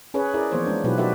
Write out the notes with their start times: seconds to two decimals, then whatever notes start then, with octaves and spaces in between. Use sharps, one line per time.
0.14 C#4 G#4 B4 C#5
0.34 E4 G#4 A#4 D5
0.51 E3 F3 A#3 B3 C5 C#5
0.67 G#3 C#4 D4
0.84 B2 F#3 D#4 F4 G4 B4
0.98 F#4 G4 A4 B4 D5 E5